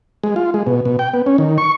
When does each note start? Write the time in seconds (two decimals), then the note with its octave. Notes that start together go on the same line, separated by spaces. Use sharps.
0.23 G#3
0.36 F4
0.54 G#3
0.67 B2
0.85 B2
0.99 G5
1.14 B3
1.26 C#4
1.38 D#3
1.58 C#6